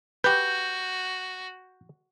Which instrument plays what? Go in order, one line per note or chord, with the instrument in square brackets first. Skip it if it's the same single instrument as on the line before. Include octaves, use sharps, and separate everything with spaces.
[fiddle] F#4 [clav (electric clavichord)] G4 B4 [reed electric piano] G6